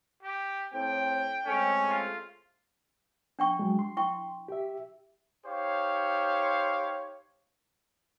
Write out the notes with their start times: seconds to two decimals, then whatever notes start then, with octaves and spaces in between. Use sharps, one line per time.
0.23 G4
0.73 A2 C4 G5
1.46 G#3 A3 C4 C#4
1.89 F4
3.39 D4 G5 C#6
3.59 F#3 G#3
3.79 C6
3.97 E4 G5 C#6
4.48 G4 E5
5.45 D#4 G4 C5 C#5 F5